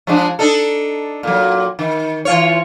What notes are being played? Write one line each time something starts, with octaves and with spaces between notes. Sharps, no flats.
F3 G#3 D4
D4 D#4 A4
A#2 F#3
D#3
E3 F4 C#5